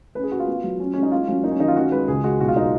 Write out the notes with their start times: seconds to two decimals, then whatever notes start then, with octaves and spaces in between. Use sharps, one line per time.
0.15 C#4 B4
0.24 G#4
0.31 A#3 F#4
0.39 F4
0.47 B3
0.64 F#3
0.80 C#4
0.93 G#3 C#4
1.03 D#4
1.11 A#3 F4
1.28 F#3 C#4
1.44 A#3 D#4
1.51 C#4
1.60 D#3 D#4
1.68 F4
1.76 C#4 F#4
1.92 G#3 B4
2.08 C#2 G#4
2.24 G#3 F#4
2.40 B1 F#4
2.48 F4
2.56 A#3 D#4